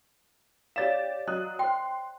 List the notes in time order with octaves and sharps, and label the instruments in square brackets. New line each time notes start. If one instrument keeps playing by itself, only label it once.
[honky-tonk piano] G4 A6 E7 [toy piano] C#5 D5 F5
[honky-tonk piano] F#3 D#6 F#6 [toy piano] D#5
[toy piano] C5 G5 [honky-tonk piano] C6